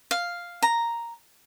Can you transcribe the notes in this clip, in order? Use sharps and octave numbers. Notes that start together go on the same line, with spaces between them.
F5
A#5